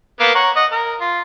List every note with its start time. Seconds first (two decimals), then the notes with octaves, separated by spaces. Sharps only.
0.20 A#3 B3 F5
0.35 C#5 F#5 A#5
0.56 D#5 F#5
0.72 A#4
1.01 F4